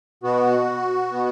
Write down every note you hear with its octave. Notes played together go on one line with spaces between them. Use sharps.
B2 B3 F#4
B2 B3